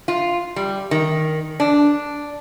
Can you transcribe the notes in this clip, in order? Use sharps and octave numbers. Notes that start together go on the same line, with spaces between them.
F4
G3
D#3
D4